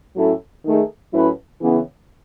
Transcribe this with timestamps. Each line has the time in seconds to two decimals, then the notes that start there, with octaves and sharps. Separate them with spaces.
0.16 A2 F#3 C#4 E4 A4
0.64 D#3 A3 D#4 G#4
1.12 A2 F#3 C#4 E4 B4
1.62 C#3 E3 B3